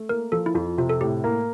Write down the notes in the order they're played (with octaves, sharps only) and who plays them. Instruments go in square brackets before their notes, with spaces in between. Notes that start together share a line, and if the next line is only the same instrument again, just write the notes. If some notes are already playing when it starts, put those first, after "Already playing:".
Already playing: [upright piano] A3
[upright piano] A#3 [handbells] A#4
[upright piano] F3 [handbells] A4
[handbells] E4
[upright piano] F2 [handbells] F4
[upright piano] C3 [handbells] F4
[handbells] A4
[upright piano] A2 [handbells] G4
[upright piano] A#3